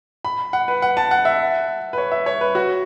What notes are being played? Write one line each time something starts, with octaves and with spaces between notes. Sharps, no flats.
B5
F#5
B4
F#5
A5
F#5
E5
B4
C#5
E5
C#5
B4
F#4